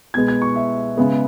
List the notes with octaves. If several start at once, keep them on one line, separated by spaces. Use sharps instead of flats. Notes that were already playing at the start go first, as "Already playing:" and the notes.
B2 G#3 B3 G#6
G#6
C#6
E5
C#3 G#3 B3